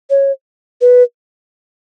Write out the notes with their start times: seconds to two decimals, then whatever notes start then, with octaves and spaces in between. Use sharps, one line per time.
0.10 C#5
0.81 B4